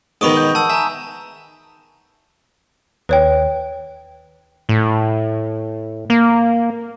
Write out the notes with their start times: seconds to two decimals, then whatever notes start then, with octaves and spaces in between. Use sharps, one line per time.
0.21 G#2 B2 D#3 B5 C#6 D#6
0.37 G6
0.55 F#5 A5 E6
0.70 E5 G#5 A#5
3.09 D#2 B4 C#5 G5
4.69 A2
6.10 A#3